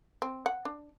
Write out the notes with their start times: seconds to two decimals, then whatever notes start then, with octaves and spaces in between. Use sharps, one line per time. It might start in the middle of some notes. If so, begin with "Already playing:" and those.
0.22 C4
0.46 F#5
0.65 D4